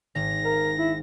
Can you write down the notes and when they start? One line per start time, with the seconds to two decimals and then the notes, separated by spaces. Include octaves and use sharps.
0.15 G#1 A#6
0.45 A#4 F5
0.78 E4